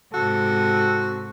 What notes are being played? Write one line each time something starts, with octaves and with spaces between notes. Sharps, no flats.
G#2 C3 F#4 A4